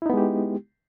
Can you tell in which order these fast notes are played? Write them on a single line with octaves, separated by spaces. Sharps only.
E4 D#4 B3 G#3 G4